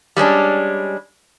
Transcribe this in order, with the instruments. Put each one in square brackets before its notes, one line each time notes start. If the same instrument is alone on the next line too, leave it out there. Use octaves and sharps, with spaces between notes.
[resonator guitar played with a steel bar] G3 G#3 C#4 D4